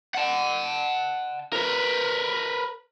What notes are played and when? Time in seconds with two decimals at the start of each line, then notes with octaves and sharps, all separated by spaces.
0.14 F#5 A5
1.53 A#4 B4